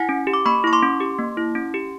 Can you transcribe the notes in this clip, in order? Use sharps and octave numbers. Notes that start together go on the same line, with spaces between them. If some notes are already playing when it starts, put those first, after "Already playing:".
Already playing: E4 F#5 G#5
C#4
G4
D6
A#3 B5 C#6
E4 C#6
C6 D6
C#4
G4
A#3
E4
C#4
G4